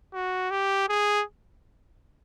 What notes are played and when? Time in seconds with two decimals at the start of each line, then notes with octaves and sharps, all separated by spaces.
0.14 F#4
0.51 G4
0.89 G#4